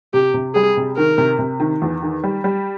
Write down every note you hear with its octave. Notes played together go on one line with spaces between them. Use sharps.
C3 G4
C3
G3 G#4
C3
D#3 A#4
C3
C3
D#3
E2
D#3
G3
G3